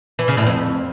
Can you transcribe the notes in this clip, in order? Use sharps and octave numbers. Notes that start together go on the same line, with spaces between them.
E3
C#3
A2
F2